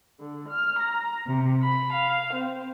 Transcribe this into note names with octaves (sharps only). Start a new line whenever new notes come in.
D3
F6
A#5
C3
B5
F5
C4